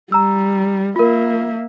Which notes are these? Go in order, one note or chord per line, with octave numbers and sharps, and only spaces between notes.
G3 A#5 E6
A#3 F4 A#4 E5